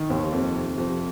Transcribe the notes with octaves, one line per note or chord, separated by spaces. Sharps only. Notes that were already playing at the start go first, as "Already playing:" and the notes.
Already playing: D#3
D#2
F2
C3
F2